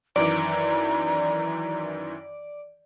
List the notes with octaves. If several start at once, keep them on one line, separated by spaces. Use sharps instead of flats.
F#2 D#3 E3 D5 A#5